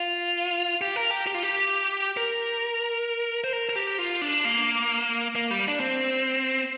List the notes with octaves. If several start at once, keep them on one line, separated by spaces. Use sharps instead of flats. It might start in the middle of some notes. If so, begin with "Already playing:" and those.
Already playing: F4
G4
A#4
G4
G4
F4
G4
A#4
C5
A#4
A#4
G4
F4
D4
A#3
A#3
G3
D4
C4